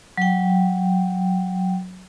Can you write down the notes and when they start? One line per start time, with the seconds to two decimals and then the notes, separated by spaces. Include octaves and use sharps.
0.17 F#3 G5